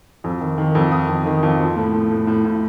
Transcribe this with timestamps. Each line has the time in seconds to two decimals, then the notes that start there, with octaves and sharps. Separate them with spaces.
0.24 F2
0.41 D#3
0.58 D#3
0.75 F2
0.92 D#3 D#6
1.09 F2
1.26 D#3
1.43 F2
1.60 F3
1.76 A2
1.93 A2
2.11 A2
2.27 A2
2.45 A2